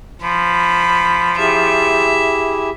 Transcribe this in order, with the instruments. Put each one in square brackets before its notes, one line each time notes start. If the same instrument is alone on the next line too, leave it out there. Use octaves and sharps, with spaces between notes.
[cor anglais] F3 [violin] B5
[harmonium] E4 G4 G#4 [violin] E5